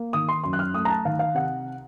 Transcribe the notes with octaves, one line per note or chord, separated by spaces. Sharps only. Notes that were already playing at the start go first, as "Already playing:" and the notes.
Already playing: A#3
D#3 D#6
C6
F#2 C6
F#6
F6
A3 D#6
A#5
A5
D#3 F5
F5
C3 F#5